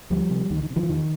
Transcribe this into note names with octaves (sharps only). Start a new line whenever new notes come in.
D2 F3 G3
C3
D2 D#3
D#3
C3
D#3 F3
E3
E2 D#3